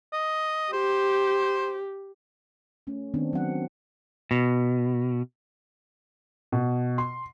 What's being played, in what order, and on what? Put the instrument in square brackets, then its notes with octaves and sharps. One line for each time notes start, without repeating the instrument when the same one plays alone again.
[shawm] D#5
[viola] G4 [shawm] C5
[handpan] A3 C#4
D#3 B3 C4 D4
F#3 C4 F#5
[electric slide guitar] B2
[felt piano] B2
C6